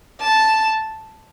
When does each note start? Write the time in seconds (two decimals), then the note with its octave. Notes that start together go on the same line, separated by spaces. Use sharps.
0.21 A5